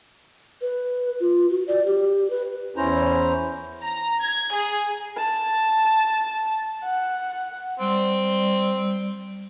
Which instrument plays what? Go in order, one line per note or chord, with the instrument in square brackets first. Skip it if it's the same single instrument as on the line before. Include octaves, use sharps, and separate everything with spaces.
[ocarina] B4
F4
F#4
D5
G4
B4
[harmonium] E2 C#4 E4 C5 A#5
[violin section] A#5
G#6
G#4
[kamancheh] A5
F#5
[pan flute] G3 [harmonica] C4